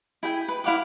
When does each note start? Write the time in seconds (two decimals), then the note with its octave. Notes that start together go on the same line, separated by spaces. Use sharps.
0.23 E4 G#4 G5
0.48 B4
0.64 E4 F5 F#5 D6